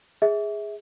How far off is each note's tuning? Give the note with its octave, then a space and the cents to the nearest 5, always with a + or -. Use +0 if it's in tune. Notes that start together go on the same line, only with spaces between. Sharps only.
G#4 -5 E5 -25